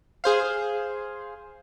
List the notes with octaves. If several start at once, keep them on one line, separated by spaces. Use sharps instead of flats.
G#4 C5 F5